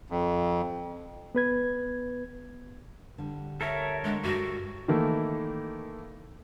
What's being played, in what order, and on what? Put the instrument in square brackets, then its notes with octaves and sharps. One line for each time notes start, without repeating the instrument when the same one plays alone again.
[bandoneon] F2
[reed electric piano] B3 B4 G#6
[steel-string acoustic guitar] D3 G3
[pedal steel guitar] A4 A#4 C#5 [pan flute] E5
[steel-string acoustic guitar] D3 E5 F#5 [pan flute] G#3
[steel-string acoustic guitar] G2 G3 [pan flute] F#4
[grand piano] D#3 E3 A3 A#3 E4